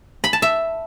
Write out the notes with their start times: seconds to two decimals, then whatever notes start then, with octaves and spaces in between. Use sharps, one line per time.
0.24 B5
0.33 A5
0.42 E5